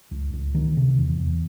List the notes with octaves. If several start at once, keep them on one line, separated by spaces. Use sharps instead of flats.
C#2
C#2
D#3
C3
E2
E2